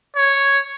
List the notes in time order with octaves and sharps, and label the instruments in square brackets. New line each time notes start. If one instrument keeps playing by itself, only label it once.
[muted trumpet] C#5